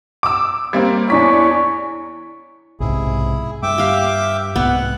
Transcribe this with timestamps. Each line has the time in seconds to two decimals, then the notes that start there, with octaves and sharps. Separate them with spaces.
0.23 D6 E6
0.73 G3 A#3 C4
1.10 E2 D4 E4 C#5 B6
2.80 B1 G#2 C3 E4 G#4
3.63 G2 E5 G5 D6
3.78 G4 F5
4.56 C2 G#2 B3 F#5